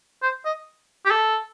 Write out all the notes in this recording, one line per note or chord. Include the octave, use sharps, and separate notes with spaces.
C5
D#5
G4
A4